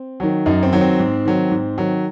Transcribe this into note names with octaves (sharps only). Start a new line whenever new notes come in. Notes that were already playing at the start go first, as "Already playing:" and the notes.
Already playing: C4
D#3 F#3
F#2 D#4
C4
D#3 F#3
C4
G#2
D#3 F#3
G#2
D#3 F#3